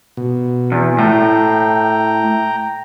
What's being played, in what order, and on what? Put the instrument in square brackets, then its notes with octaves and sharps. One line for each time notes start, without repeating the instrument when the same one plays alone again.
[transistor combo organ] B2
[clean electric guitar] E2
[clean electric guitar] A2 [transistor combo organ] G5 A#5